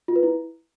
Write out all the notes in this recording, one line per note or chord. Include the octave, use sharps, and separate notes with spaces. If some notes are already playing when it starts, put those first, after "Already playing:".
F4
B4
E4